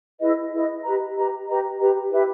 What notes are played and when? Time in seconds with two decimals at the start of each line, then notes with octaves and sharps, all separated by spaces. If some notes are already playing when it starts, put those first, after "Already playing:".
0.20 E4 G#4 B4 D#5
0.52 E4 G#4 B4 D#5
0.83 G4 B4 D#5 A#5
1.16 G4 B4 D#5 A#5
1.48 G4 B4 D#5 A#5
1.79 G4 B4 D#5 A#5
2.11 E4 G4 B4 E5